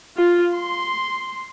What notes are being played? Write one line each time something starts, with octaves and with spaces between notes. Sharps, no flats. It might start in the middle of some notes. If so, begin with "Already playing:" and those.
F4
C6